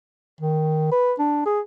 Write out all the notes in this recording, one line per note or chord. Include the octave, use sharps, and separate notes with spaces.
D#3
B4
D4
G#4